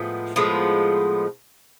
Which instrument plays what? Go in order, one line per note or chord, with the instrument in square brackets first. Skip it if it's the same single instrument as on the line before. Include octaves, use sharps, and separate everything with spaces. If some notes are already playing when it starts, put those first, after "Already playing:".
Already playing: [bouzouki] A2 F3 G#3 B3
A2 F3 G#3 B3